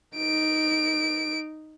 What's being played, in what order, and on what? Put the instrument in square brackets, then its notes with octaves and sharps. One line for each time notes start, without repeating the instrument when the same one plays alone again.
[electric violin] D#4 D7